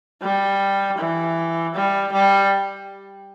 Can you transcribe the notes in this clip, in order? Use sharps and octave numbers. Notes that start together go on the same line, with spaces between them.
G3
E3
G3
G3